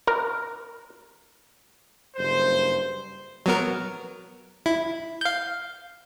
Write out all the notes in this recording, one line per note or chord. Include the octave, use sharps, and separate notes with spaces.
A#4
F#1 G2 C5
F#3 B3 A#4
E4
F5 G6